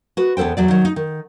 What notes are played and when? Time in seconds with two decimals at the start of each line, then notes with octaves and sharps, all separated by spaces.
0.17 F#4 B4
0.37 E2 B3 A4 C5 G5
0.57 E2 F#3 D5
0.68 D#3 F#3
0.85 D#4
0.96 D#3